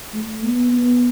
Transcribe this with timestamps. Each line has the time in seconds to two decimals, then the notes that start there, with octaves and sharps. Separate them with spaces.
0.14 A3
0.43 B3
0.73 B3